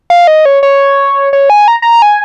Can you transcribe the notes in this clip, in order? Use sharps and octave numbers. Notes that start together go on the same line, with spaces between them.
F5
D#5
C#5
C#5
C#5
G#5
A#5
A#5
G#5